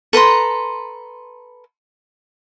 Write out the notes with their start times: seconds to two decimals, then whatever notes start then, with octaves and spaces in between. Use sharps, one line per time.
0.13 A4 B4 A#5 C6